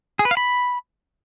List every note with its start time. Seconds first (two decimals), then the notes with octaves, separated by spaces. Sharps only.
0.19 G#4
0.25 B4
0.31 F5
0.37 B5